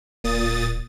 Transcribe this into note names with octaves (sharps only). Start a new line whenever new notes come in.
D1 A#2 D#6 A6